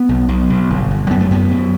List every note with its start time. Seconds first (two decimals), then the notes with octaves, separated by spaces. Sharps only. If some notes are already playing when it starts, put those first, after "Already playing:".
Already playing: B3
0.09 B1
0.28 B1
0.50 B1
0.70 G1
0.91 G1
1.10 F#2 B3
1.20 A3
1.31 F#2 B3
1.51 F#2